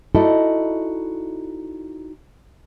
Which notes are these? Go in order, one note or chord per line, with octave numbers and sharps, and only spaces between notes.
D#4 E4 F#4 A4 D5 D#5